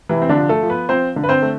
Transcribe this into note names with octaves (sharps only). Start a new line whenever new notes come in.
C3 E3 E4
C4
D3 D4
F3
A3 A4
F3
B3 B4
F3 C4 C5
D3
B4
C4 C5
A3